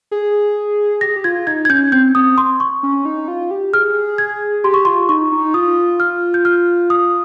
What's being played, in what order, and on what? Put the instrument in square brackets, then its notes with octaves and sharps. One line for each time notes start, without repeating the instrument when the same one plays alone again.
[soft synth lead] G#4
[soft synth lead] G4 [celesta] A#6
[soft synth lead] G#4
G4
[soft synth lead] F4 [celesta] G#6
[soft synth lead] D#4 [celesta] G#6
[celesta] G#6
[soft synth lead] C#4 [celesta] G6
[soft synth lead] C4 [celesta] G6
[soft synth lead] C4 [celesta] D#6
[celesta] C6
C#6
[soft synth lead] C#4
D#4
F4
G4
[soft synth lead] G#4 [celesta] F6
[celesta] G#6
[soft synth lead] G4 [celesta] C6
[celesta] C#6
[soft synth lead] F4 [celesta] C6
[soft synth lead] D#4 [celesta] C#6
[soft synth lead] D#4
[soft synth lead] F4 [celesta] D#6
[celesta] F6
G6
F6
D#6